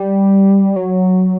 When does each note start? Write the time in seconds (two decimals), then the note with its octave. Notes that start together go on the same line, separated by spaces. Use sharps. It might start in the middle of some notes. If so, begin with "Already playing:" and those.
Already playing: G3
0.76 F#3